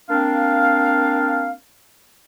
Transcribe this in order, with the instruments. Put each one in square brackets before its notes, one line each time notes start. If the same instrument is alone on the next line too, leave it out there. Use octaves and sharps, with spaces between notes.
[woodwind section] A#3 C4 D4 F5